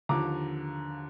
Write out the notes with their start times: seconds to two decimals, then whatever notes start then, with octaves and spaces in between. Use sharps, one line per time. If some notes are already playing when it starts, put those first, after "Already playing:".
0.09 D#2 D3 F3 A#5 D6